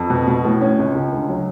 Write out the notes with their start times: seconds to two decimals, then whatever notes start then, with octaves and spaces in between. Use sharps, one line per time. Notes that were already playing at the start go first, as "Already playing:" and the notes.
Already playing: F2
0.10 B2
0.28 B2
0.45 A2
0.61 C#4
0.78 C#2
0.95 C#2
1.12 D2
1.29 F#3